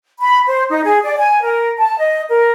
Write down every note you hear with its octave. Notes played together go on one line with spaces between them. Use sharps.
B5
C5
D#4
G#4
D5
G#5
A#4
A5
D#5
A#4